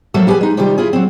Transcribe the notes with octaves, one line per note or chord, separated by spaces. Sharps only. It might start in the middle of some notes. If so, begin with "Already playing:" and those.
F3 F#3 A3 A#3 A4 E5
E4 G4 G#4 B4 G#5
G#3 D#4
C3 D#3 G3 F4 G4
E4 F4 G#4
F#3 C4